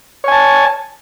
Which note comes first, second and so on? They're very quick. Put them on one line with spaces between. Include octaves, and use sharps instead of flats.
C#5 G#5 A5